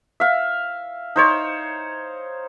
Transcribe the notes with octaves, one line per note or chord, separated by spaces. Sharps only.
E5 F5
D#4 C5 C#5